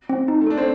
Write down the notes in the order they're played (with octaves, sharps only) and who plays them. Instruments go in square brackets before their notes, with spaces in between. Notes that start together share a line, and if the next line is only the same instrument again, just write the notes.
[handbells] C4
D#4
[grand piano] A3
[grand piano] D4 [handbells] A4
[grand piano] C4